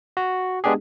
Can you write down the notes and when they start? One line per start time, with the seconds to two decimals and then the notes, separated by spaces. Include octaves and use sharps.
0.17 F#4
0.64 G#3 B3 D4 G4 G#4